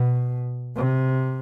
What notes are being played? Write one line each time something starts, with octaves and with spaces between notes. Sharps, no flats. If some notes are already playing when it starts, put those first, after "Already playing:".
Already playing: B2
C3